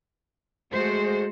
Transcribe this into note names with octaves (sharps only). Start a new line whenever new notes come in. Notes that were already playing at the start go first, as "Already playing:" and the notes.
G#3 A3 F#4 C5